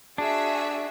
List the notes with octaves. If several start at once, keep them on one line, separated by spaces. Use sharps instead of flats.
D4 F#4 G#4 E5